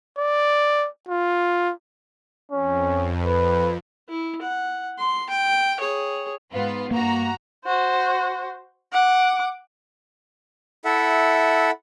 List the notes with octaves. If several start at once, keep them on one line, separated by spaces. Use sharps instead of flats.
D5
F4
F2 C#4
B4
E4
F#5
C6
G5
G#4 C#5
G#2 B3 F4
G2 A#3 F#4 A#5
F#4 C5
F#5 D6
E4 A4 E5 F#5